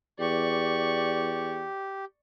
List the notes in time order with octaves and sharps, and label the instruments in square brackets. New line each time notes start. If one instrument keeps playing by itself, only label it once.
[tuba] E2 [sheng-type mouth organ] G4 [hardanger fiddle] D5 C#6